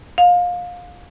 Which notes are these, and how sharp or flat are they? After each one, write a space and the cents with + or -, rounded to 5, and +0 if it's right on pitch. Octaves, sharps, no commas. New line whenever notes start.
F5 +25